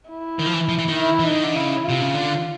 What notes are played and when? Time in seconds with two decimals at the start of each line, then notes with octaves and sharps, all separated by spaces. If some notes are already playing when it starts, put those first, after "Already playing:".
0.10 E4
0.40 D#3
0.46 F3
0.54 E3
0.69 F3
0.78 E3
0.88 D#3
0.97 E4
1.19 E3
1.27 D#3 D#4
1.44 D3
1.55 C#3 E4
1.85 C3 F4
2.02 C#3
2.14 D3